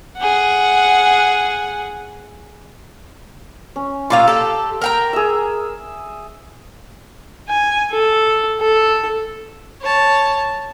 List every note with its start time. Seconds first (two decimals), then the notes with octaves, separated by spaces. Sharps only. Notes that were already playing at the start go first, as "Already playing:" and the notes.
0.18 G#4 F#5
3.76 C#4
4.10 A#2 F4 F5 C6 D6 E6
4.28 G4 A4
4.82 A#4 G5 A#5
5.13 G#4 E5
7.49 G#5
7.92 A4
8.61 A4
9.82 C#5 A5